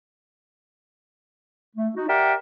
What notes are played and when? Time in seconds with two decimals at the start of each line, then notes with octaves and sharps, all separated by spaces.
1.76 A3
1.96 D#4 F#4
2.08 G4 A#4 D5 E5 F#5 G5